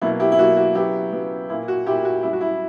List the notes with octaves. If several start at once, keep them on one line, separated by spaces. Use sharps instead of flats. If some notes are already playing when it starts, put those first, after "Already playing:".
B2 F#3 A#3 E4
E4 G4
E4
B2 F#3 A#3 F#4
F#4
C#3 F#3 B3 E4 G4
C#3 F#3 B3
A#2 A#3 E4
F#4
A#2 A#3 E4 G4
F#4
F#2 C#3 G3 E4
F#4
E4